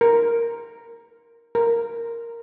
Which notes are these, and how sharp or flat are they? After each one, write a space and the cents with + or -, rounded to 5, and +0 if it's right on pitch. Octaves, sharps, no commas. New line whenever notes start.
A#4 +0
A#4 -5